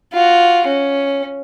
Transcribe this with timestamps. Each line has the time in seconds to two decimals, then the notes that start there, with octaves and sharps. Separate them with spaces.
0.13 F4 F#4
0.67 C#4